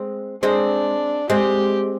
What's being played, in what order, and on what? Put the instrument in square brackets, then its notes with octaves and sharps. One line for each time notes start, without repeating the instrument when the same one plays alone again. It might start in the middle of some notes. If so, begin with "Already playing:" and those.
Already playing: [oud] G#3 C4
[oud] G#3 C4 [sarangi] D4
[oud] G#3 C4 [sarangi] G4